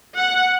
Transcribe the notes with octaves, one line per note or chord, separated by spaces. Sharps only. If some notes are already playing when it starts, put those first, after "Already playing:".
F#5